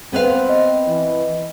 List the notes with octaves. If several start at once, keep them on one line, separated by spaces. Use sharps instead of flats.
B3 C4 B4 F5
D#5
E3